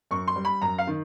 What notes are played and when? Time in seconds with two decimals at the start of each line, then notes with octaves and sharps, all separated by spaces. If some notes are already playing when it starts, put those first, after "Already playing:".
0.11 F#2 C#6
0.28 C6
0.36 G3
0.45 B5
0.61 F#2 A#5
0.78 F5
0.87 D#3